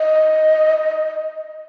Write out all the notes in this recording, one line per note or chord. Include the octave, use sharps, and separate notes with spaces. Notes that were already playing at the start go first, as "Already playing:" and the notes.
Already playing: D#5